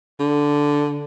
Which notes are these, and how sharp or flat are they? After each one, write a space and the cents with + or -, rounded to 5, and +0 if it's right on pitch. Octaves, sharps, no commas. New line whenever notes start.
D3 -5